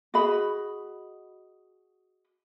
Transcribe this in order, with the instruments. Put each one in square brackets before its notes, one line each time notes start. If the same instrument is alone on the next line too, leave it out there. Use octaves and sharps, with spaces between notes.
[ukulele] F#4 G#4 D#5 B5